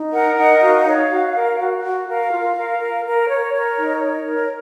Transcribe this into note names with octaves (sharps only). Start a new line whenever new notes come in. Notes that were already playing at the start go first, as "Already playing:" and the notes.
Already playing: D#4
A#4 F#5
D#4 F#5
F#4 F5
C#5
F#4
A#4
F#4
F#4
A#4 F5
F4
A#4
A#4
A#4
C#5
A#4 C#5
D#4
C#5
A#4